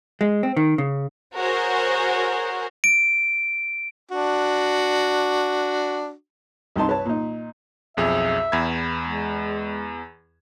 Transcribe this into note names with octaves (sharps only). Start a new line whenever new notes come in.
G#3
C4
D#3
C#3
F#4 G#4 A#4 C5 C#5
D7
D4 F#4
C2 G2 C3 D#4 A5 C6
B4 C#5 A5
A#2 D#4
B1 F2 G#4 E5
E2 B5 G#6
G#3